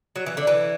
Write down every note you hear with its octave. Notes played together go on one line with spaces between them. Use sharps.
F#3
E3
D3
E3